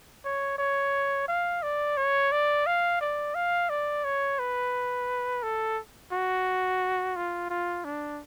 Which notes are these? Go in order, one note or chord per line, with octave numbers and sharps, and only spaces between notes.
C#5
C#5
F5
D5
C#5
D5
F5
D5
F5
D5
C#5
B4
A4
F#4
F4
F4
D4